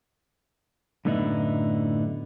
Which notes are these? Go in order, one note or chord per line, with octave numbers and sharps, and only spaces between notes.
F#2 A2 D3 B3 D#4 E4